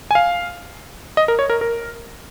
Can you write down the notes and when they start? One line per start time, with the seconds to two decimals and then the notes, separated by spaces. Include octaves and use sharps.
0.11 G#5
0.15 F5
1.17 D#5
1.28 A#4
1.39 C#5
1.50 A#4
1.61 A#4